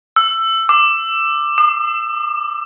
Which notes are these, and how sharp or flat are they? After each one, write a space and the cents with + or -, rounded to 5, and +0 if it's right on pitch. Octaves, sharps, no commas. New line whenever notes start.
E6 +15
D6 +15
D#6 -45